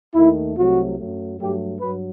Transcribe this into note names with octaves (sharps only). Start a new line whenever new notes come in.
D#2 D#3 A3 E4
C2 C3 F#3 A3 F#4
F#2 F#3 A3
G2 F#3 A3 G4
G2 F#3 B4